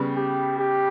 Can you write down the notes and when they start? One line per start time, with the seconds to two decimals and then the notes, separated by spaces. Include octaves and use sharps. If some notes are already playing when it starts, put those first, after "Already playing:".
Already playing: C#3 G3 B3
0.17 G4
0.59 G4